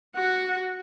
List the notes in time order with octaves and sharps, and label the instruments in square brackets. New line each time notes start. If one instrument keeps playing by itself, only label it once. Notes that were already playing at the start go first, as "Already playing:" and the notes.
[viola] F#4 [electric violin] F#5